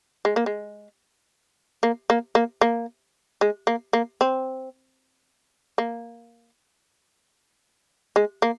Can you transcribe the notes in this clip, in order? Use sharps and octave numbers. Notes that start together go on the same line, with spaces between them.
G#3
A#3
G#3
A#3
A#3
A#3
A#3
G#3
A#3
A#3
C4
A#3
G#3
A#3